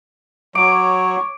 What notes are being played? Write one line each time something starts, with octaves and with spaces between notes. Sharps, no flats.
F#3 C#5 D6